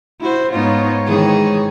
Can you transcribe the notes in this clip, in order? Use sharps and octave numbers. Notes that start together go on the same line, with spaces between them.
E4 F#4 C5
G#2 B3 D#4 F4 C#5
D#3 E3 G#4